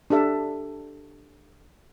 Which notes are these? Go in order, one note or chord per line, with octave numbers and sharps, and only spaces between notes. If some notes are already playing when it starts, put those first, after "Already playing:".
D4 G4 A4 E5